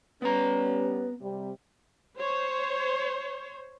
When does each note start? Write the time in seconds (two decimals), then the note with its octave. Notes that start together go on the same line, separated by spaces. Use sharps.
0.22 G3 B3 C#4 B4 A#5
1.21 C3 G3
2.18 C5 C#5